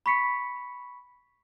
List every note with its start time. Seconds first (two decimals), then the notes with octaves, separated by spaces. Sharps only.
0.06 B5 C#6 B6 C#7